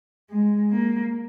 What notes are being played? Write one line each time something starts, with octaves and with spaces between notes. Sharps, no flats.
G#3
A#3